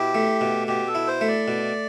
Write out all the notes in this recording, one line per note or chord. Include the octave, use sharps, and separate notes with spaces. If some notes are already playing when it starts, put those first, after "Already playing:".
Already playing: B2 E4 G4
A3
B2
B2 G4
A4
E4
C5
A3
D5
B2